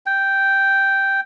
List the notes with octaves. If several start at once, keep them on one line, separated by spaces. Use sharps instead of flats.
G5